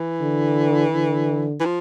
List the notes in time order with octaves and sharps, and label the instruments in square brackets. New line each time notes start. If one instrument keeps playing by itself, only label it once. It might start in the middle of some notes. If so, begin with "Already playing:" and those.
Already playing: [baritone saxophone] E3
[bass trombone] D3
D3
[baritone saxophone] E3
F3